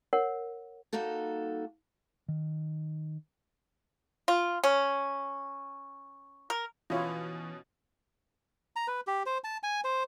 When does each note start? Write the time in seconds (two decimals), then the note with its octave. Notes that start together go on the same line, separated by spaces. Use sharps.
0.13 A#4 C#5 F#5
0.93 G3 A#3 D#4 F#4 A4
2.28 D#3
4.28 F4
4.64 C#4
6.50 A#4
6.90 B2 E3 C#4 E4 F4 C#5
8.76 A#5
8.88 B4
9.07 G4
9.26 C5
9.44 A5
9.63 G#5
9.84 C5